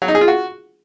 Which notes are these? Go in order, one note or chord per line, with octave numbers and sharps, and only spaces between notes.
F#3
D#4
G#4
F4
F#4